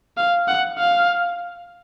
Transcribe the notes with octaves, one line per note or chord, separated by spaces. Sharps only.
F5
F#5
F5